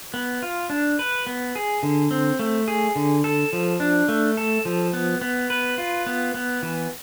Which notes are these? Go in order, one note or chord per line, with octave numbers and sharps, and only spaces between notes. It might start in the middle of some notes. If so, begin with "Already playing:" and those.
B3
F4
D4
B4
B3
G#4
D3
C4
A3
G#4
D3
A4
F3
D4
A3
A4
F3
B3
B3
B4
F4
B3
B3
E3